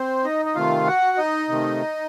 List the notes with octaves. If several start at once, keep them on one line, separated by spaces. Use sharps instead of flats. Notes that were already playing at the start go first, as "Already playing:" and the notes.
Already playing: C4 C5
D#4 D#5
D#5
C3 D#3 A3 F4 F5
F#4 F#5
D#4 D#5
C3 D#3 A3